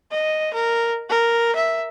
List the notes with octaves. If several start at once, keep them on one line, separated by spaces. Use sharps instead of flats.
D#5
A#4
A#4
E5